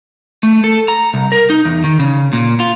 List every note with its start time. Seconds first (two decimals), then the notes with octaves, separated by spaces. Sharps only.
0.43 A3
0.64 A4
0.88 A#5
1.14 C2
1.32 A#4
1.50 D#4
1.65 E2
1.84 D#3
2.00 C#3
2.33 A#2
2.60 F4